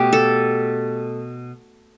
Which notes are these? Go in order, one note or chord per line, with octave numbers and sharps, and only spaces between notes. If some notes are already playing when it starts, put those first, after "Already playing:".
Already playing: B2 A3 G4
A4